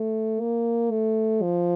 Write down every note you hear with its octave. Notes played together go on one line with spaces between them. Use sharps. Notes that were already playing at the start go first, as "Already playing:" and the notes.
Already playing: A3
A#3
A3
F3